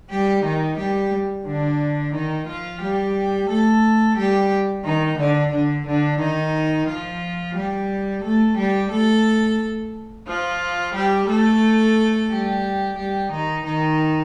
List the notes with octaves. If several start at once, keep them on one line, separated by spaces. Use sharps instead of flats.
G3 G4
D#3 D#4
G3 G4
D3 D4
D#3 D#4
F3 F4
G3 G4
A3 A4
G3 G4
D#3 D#4
D3 D4
D3 D4
D3 D4
D#3 D#4
F3 F4
G3 G4
A3 A4
G3 G4
A3 A4
F3 F4
G3 G4
A3 A4
G3 G4
G3 G4
D#3 D#4
D#3 D#4